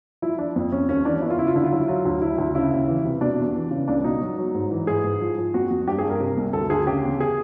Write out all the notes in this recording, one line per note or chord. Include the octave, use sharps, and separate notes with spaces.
F3 E4
F3 D4
F2
F2 C#4
D#2 C#4
E3 D4
E2 E4
F4
C#3 E4
F4
D3 E4
F4
F#3 E4
F#3 F4
D2
D2 E4
D2
C#3 E4
D#2
E3
C3
B2 D4
E2
E3
C#3
C#2 D4
B2 D#4
F#3
F#3
G#2
E3
G#2 G#4
G#2
F3
F3
F2 F#4
F2
G2 G4
G#4
G2
A#4
C3
C2
D2 A4
D2 G#4
C#3 G4
E2
G#4